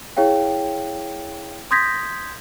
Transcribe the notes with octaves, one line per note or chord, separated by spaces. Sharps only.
E4 G#4 C#5 F5 G5
C6 D#6 G6 G#6 A#6 B6